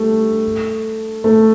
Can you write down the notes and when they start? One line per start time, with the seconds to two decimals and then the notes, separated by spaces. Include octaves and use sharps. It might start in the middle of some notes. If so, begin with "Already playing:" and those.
Already playing: G3 A3
1.24 A3